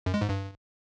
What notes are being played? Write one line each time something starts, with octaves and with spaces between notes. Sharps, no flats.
F#2
G#3
G#2
G2